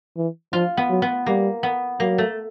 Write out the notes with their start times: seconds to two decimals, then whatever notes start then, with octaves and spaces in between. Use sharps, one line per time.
0.17 E3
0.53 F3 F4
0.77 B3
0.90 F#3
1.02 B3
1.26 G3 A#3
1.63 B3
2.00 F#3 A#3
2.18 A3